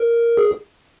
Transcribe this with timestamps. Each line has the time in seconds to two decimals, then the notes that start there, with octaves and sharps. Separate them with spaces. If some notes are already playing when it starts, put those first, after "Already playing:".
Already playing: A#4
0.37 G#4